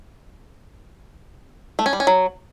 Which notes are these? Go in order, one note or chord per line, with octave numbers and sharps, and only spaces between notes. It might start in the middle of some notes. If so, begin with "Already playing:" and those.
A3
C#4
G3
C#4
F#3